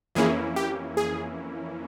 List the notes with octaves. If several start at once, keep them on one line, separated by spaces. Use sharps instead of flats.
F2 E3 A#3 C#4 E4 G#4
G4
G#4